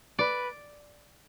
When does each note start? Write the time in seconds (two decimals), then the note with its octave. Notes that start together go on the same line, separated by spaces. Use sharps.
0.19 B4 D5